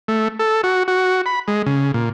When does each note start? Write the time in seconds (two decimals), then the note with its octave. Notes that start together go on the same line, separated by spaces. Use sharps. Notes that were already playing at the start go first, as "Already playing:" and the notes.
0.08 A3
0.39 A4
0.63 F#4
0.88 F#4
1.26 B5
1.48 G#3
1.66 C#3
1.94 A#2